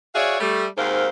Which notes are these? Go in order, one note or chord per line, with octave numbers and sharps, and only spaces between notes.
F#4 G#4 C#5 D5 E5 F5
G3 A3
D#2 G#2 C4 A#4 C5 F5